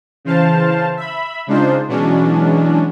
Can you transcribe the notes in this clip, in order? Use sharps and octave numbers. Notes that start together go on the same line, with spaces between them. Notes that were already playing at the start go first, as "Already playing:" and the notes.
C#3 E3 C5 F5 A5
E5 B5
C#3 G#3 D4 D#4 F4 C5
B2 E3 F#3 G#3 C#4 D4